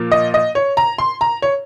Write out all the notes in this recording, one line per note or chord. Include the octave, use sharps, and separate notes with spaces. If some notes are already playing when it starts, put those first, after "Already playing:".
Already playing: A#2 F3 A#3
D#5
D#5
C#5
A#5
C6
A#5
C#5